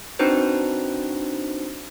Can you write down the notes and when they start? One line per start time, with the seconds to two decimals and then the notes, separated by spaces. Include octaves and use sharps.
0.19 C4 D4 D#4 F#4 B4 C5